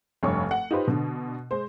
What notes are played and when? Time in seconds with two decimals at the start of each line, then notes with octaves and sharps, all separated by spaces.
0.23 F1 G2 C#5 C#6
0.51 F#5
0.71 D#4 F4 G4 B4 C5
0.88 B2 D3
1.51 G#3 C5